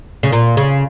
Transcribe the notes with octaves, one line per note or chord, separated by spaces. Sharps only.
C#3
A#2
C#3